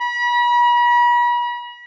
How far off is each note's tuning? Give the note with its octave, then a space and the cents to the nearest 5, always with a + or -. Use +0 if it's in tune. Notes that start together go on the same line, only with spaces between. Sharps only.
B5 -40